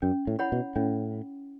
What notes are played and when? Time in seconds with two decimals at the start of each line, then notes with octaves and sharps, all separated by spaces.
0.02 F#2 C#4
0.27 A2
0.39 E4 C#5 F#5 B5
0.52 B2
0.76 A2 C#4